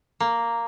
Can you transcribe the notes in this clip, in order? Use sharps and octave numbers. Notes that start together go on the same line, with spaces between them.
A#3